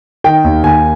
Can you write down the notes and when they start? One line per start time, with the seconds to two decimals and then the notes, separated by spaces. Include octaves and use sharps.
0.24 D#3 G5
0.44 D#2
0.64 D#2 G#5